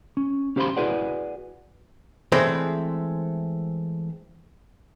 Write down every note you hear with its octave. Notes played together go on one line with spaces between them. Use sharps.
C#4
C#4 G4 C5 F5 B5 C6
E4 F#4 G#4 B4 D5 F#5
E3 G#3 A3 C4 C5 D5